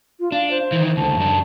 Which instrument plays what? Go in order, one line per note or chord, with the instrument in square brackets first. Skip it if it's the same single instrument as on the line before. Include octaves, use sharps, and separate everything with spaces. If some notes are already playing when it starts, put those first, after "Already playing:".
[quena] F4
[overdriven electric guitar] D4 [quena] F5
[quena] C5
[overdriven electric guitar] D#3 E3
[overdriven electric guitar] C#2 D3 [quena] A5
[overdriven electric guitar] F#2 D4